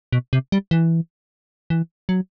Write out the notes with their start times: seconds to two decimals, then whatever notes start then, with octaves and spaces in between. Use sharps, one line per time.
0.13 B2
0.33 C3
0.52 G3
0.71 E3
1.70 E3
2.09 F#3